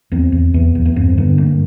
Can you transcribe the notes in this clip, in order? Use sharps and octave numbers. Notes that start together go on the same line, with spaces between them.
E2 C4
E2
E2 B3
E2
B3
G2 C4
D3 B3
G2 A#3